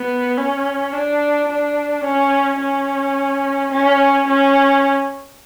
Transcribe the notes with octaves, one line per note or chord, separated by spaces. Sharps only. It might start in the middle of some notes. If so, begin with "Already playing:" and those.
Already playing: B3
C#4
D4
D4
C#4
C#4
C#4
C#4